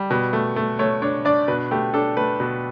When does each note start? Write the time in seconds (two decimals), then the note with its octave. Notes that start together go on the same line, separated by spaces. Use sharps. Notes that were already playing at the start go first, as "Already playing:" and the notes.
Already playing: G3
0.10 B2
0.33 A3
0.56 A3
0.79 A3 C#5
1.02 D4 C#5
1.25 D4 D5
1.48 B2 B4
1.71 A3 G4
1.94 D4 A4
2.17 A3 B4
2.40 B2